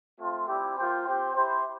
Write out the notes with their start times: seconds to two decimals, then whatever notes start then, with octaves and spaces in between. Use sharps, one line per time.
0.18 A3 C4 F4 C5
0.48 G3 C4 E4 G4
0.77 A#3 F4 C5 G5
1.06 C4 G4 C5 G5
1.35 E4 G4 C5